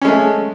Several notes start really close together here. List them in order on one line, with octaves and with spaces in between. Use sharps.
C#4 G#3 A3